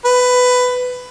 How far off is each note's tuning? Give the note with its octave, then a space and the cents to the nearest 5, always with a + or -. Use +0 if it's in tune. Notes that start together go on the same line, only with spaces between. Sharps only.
B4 +15